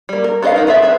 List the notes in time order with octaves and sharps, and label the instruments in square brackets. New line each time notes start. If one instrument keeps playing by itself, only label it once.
[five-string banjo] G3 A#3
A#4
B3 A4 A#4 D#5 F5
B3 D#4 A#4
B3 F4 G#4 E5
C4 B4 E5